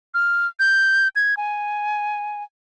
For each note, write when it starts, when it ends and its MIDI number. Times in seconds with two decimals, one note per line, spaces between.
0.14 0.47 89
0.60 1.08 91
1.16 1.35 92
1.37 2.43 80